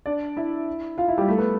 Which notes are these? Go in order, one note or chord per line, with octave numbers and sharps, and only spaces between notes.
D4 D5
E4 E5
F4 F5
E4 E5
G3 G4
A3 A4
B3 B4